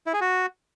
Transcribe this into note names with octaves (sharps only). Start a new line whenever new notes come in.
E4
G#4
F#4